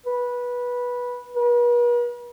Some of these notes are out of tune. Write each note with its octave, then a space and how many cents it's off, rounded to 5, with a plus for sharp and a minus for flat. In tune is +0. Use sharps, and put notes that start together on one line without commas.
B4 -15
B4 -45